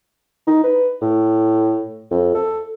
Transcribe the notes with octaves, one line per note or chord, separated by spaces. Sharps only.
D#4
B4
A2
F2
A4